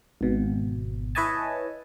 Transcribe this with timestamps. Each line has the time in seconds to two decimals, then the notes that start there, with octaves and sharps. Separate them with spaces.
0.21 G#1 B2
1.15 E4 B4 C#5 D#5 G#5 A5